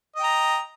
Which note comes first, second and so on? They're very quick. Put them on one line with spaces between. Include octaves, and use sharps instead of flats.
D#5 G5 A#5